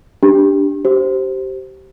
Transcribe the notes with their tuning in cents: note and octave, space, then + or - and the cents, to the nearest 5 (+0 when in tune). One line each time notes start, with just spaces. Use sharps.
D4 +0 G4 +0
G4 -25 C5 +0